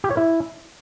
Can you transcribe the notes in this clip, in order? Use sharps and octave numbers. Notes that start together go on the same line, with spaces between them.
G4
C#5
E4